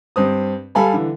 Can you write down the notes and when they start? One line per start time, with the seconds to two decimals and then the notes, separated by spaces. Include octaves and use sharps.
0.16 G2 C4 D#6
0.75 G3 A4 F5 G#5 A5 B5
0.93 D3 E3